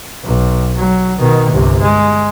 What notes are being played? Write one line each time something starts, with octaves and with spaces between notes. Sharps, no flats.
B1
F#3
B2 D#3
G1 C2
G#3